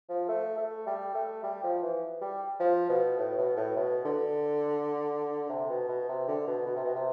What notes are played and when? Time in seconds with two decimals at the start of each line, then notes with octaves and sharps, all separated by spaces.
0.09 F3
0.29 A3
0.58 A3
0.87 G3
1.15 A3
1.44 G3
1.64 F3
1.82 E3
2.22 G3
2.60 F3
2.89 B2
3.17 A2
3.38 B2
3.57 A2
3.77 B2
4.05 D3
5.49 C3
5.69 B2
5.89 B2
6.09 C3
6.28 D3
6.47 B2
6.66 B2
6.76 C3
6.85 B2
6.95 C3